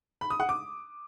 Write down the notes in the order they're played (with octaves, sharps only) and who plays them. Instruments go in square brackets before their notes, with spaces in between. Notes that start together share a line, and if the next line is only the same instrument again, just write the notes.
[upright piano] B5
D#6
F#5
D6